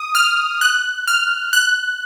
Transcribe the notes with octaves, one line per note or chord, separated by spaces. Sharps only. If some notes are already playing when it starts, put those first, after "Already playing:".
Already playing: D#6
F6
F#6
F6
F#6